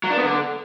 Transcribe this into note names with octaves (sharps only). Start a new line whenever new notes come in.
F#3
D4
B3
D3